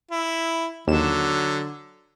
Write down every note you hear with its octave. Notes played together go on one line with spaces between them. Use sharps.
E4
D#2 D3 F#3 E7